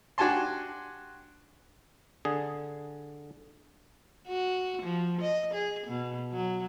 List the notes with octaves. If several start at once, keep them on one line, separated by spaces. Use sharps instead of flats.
D4 F#4 G4 G#5 A5 C6
D3 G#4
F#4
F3
D#5
G#4
B2
F#3